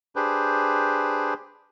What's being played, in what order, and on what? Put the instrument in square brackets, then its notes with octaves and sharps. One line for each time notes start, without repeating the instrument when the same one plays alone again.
[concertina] D4 G4 G#4 B4 C5